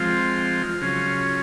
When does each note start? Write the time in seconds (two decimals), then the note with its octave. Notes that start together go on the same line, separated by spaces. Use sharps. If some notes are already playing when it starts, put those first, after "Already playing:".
Already playing: F3 G#3 C4 F4 F5
0.81 C#3 F#3 C#4 F4